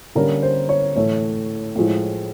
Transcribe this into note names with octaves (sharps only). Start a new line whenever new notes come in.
D3 G3 A#3 C#4 A#4
C5
C#5
A2 E3 A3 C#5
A2 F3 G#3